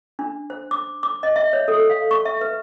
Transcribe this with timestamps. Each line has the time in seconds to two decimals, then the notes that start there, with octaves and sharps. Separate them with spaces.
0.19 D4
0.50 C5
0.71 D6
1.03 D6
1.23 D#5
1.36 E5
1.53 C#5
1.68 A4
1.90 F5
2.11 C#6
2.25 E5
2.41 B4